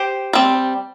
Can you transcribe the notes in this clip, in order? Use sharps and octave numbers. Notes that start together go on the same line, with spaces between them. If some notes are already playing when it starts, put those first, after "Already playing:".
Already playing: G4 C5
G3 C4